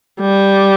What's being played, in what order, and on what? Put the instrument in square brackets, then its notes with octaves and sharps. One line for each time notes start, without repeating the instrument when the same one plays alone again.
[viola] G3